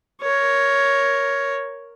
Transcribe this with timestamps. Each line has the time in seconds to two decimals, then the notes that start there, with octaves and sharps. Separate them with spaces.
0.21 A#4 C#5